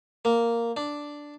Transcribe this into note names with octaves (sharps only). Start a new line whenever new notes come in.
A#3
D4